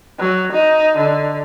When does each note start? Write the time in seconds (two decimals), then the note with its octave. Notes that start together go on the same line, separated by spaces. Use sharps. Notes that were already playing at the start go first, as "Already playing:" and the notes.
0.20 F#3
0.52 D#4
0.97 D3